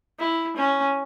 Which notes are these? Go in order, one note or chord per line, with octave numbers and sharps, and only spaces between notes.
E4
C#4